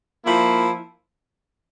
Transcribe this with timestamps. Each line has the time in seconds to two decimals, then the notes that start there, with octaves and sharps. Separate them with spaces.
0.25 F3 A#3 E4